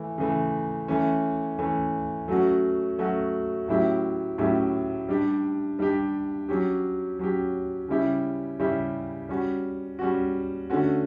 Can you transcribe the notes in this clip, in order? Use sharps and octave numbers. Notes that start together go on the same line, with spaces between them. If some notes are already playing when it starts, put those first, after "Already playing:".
Already playing: E3 A3
C#3 E3 A3
E3 A3 C#4
E3 A3 C#4
F#3 A3 C#4 F#4
F#3 A3 C#4 F#4
A2 F#3 C#4 E4 G4
A2 F#3 C#4 E4 G4
G3 D4 G4
G3 D4 G4
F#3 C#4 G4
F#3 C#4 G4
C#3 G3 C#4 E4 G4
C#3 G3 C#4 E4 G4
G3 C#4 F#4
G3 C#4 F#4
D3 A3 C#4 F#4